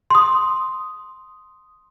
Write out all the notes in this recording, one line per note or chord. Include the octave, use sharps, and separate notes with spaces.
C6 D#6